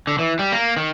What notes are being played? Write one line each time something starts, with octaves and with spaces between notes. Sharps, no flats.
D3
E3
G3
A#3
D#3